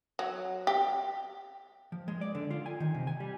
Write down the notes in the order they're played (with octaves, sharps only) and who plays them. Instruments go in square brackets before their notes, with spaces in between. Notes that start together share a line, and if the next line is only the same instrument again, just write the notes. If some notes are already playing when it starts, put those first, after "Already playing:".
[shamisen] F#3
G4
[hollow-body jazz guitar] F3
G#3
D5
D3
F4
G#5
D#3
C3
G#5
G3